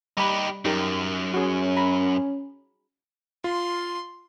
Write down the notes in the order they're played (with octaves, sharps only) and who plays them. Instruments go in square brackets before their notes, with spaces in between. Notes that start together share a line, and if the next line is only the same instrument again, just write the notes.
[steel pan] G3 B5 [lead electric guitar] D#4 G4
[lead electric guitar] F#2 [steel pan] D#4 G4 A#4
[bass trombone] C#4 [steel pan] F#4 G#4
[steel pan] A#5 B5
[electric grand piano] F4 [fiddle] C6